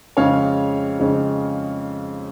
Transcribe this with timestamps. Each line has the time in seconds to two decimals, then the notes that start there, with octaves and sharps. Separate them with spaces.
0.17 F2 C#3 G#3 C#4 C#5 F5
0.99 F2 C#3 G#3 C#4